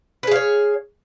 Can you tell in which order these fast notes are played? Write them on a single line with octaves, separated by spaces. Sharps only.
B4 G#4 F5 C#5